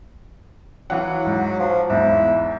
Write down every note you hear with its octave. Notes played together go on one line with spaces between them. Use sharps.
E3 F#3 F5 F#5
G#2
F3
E2 G#2 E4